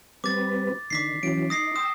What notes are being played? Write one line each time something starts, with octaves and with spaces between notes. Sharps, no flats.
G3 C4 B4 D6 A6
D3 D#3 D6 B6 C7
E3 F#3 C#4 D7
D#4 D#6 A#6 C7
G5 C6 D#6 E6